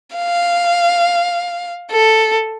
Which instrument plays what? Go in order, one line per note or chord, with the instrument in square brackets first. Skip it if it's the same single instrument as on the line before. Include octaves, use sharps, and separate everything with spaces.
[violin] F5
A4